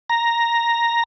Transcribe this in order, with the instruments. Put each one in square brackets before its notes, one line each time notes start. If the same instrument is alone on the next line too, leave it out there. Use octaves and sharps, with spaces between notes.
[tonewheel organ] A#5